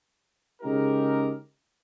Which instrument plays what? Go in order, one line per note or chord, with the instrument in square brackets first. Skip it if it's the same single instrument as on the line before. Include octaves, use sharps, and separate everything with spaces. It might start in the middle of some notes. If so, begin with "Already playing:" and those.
[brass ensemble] C#3 G#3 D#4 G4 A#4